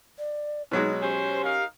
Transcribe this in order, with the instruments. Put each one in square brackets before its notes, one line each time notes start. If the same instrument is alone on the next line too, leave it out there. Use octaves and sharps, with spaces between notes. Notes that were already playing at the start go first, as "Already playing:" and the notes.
[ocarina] D5
[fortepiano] B2 F#3 G#3 [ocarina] D#4
[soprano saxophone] C#4 [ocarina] G4 [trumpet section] C5
[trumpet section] D#4 A#4 F5